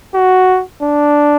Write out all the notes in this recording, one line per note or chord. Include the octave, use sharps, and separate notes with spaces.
F#4
D4